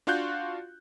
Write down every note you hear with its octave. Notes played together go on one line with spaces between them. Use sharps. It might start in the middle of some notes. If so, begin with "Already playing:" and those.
D4 F4 F#4 F5 F#6 G6